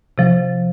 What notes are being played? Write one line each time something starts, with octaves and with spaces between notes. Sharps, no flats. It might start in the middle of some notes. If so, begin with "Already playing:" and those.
C3 F3